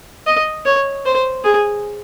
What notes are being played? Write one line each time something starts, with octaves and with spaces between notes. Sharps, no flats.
D#5
C#5
C5
G#4